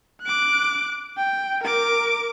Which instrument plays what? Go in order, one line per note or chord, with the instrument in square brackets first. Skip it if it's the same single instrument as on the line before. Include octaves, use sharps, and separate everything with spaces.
[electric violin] D6 F#6
G5
A#4 D6